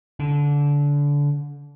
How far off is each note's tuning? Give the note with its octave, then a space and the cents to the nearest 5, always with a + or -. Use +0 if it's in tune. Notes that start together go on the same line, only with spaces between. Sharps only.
D3 -25